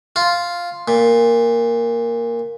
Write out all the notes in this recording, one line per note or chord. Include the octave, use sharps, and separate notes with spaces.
F4
A#2